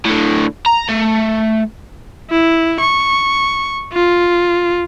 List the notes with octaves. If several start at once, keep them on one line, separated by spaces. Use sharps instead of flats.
A2 D3
A#5
A3
E4
C#6
F4